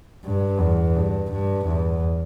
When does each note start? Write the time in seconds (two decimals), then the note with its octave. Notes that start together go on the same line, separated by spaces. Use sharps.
0.25 G2
0.60 E2
0.96 G2
1.31 G2
1.66 E2